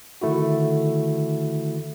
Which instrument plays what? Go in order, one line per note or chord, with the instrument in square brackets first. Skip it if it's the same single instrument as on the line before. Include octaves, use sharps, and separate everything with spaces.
[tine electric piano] D3 D#3 A3 E4 F#4